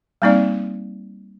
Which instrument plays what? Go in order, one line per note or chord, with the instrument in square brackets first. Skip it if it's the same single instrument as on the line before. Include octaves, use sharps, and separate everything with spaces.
[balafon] G3 A#3 C4 D#4 D5